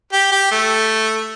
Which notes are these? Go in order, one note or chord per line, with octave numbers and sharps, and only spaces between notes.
G4
G4
A3